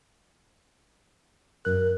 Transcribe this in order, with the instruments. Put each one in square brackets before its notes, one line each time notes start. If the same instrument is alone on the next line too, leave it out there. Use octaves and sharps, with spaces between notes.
[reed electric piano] F#2 F#6 [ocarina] A#4